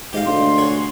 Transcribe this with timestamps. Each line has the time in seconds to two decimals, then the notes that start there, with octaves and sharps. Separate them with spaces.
0.13 G#2 G4 D#5 F5
0.26 D2 C6
0.58 F#4 G#4 C#5